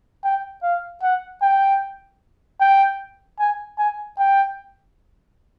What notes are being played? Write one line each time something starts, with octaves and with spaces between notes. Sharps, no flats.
G5
F5
F#5
G5
G5
G#5
G#5
G5